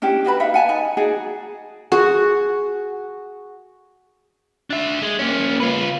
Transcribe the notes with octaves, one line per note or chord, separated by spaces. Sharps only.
C#4 D4 E4 G4
D4 F#4 B4 B5
D#4 E5 F5
F#5 G#5 A5
D#4 G#5
D#4 F#4 G#4 D5
F#4 G#4 F#5
D4 E5
G#3
A#3 C#4
F4 B4